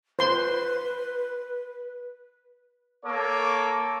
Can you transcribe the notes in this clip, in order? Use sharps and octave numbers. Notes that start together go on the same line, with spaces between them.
B4 C5 C6
A#3 A4 C#5 D6